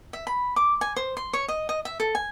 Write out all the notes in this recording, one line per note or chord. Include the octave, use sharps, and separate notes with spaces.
E5
B5
D6
G#5
C5
C6
C#5
D#5
D#5
E5
A4
G#5